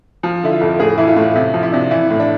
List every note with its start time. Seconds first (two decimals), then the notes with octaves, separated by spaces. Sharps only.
0.23 F3
0.43 D3 E4
0.52 F4
0.61 F2
0.79 A2 G#4
0.98 E3 E4
1.07 F4
1.16 A2
1.36 C3 E4
1.54 F3
1.63 E4
1.73 C3 D4
1.91 E3 E4
2.10 A2
2.20 D4